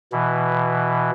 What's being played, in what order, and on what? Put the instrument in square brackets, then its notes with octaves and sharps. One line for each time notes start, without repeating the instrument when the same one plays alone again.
[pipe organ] B2 E3